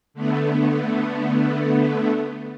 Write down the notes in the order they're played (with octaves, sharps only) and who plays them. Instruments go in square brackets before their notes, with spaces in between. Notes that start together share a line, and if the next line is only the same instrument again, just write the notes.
[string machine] D3 A3 B3